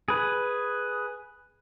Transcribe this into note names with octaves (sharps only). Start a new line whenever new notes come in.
G#4 B4